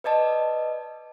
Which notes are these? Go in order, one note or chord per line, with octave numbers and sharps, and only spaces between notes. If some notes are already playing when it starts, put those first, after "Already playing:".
B4 D5 D#5 A5